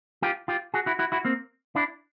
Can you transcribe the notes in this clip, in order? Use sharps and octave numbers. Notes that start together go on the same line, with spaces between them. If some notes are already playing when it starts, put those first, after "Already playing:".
F4 G4
F4 G4
F#4 G#4
E4 F#4
E4 F#4
E4 F#4
A#3 C4
D4 E4